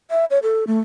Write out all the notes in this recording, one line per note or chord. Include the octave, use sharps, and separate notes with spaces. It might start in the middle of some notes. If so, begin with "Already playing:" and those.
E5
C#5
A4
A3